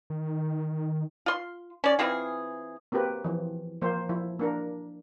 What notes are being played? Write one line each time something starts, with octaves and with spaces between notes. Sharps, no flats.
D#3
F4 C6
C#4 D5
E3 C4 F4 G#4
A#3 C4 F#4 G4 B4
E3 F3
F3 A#3 C5
F3 E4
A#3 D4 A#4